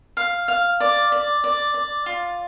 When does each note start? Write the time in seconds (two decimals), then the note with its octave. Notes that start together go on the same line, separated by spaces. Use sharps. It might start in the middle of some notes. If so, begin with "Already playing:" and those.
0.17 F5
0.48 F5
0.80 D5
1.12 D5
1.44 D5
1.74 D5
2.06 F4